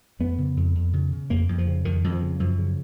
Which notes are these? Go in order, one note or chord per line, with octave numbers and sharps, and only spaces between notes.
F2 B3
C#3
F2
F2
C#3
C#3
F2 A#3
F2
F3
C#3
F2 D#3
F2
F3
C#3
F#2 F3
C#3